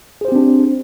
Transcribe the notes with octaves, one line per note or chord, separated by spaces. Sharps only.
C4 D4 G4 G#4 C5